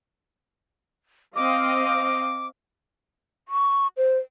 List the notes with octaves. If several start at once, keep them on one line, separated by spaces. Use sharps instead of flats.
C4 D#5 F5 D6
C#6
C5